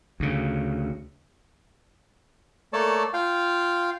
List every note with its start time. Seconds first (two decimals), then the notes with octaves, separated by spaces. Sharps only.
0.20 D2 C#3
2.73 A3 A#3 A4 C#5 D5 A5
3.13 F4 F5 G5